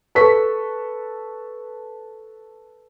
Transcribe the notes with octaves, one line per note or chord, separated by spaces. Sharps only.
A4 B4 C#6 B6